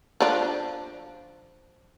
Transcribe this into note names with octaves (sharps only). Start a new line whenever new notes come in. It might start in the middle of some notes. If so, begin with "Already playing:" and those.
F3 D4